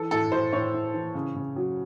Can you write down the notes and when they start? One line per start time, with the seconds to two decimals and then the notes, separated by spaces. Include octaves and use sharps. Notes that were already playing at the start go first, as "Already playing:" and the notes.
Already playing: E3 A4
0.11 A2 A4
0.32 A2 C5
0.53 A2 C#5
0.74 A2
0.94 E3
1.15 C#3
1.36 C#3
1.56 F#3